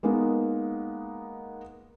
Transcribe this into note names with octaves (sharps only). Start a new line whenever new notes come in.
G#3 A#3 B3 D#4